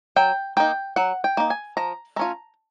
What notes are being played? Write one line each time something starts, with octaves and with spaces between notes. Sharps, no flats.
F#3 G5
A#3 D#4 G5
F#3 F#5
G5
A#3 D#4
G#5
F3 A#5
A3 C#4 F4 A#5